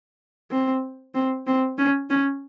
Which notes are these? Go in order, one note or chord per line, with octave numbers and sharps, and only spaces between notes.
C4
C4
C4
C#4
C#4